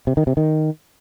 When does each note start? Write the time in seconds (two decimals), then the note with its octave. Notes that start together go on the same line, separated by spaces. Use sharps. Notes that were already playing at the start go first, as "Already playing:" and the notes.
0.07 C3
0.17 D#3
0.27 C3
0.37 D#3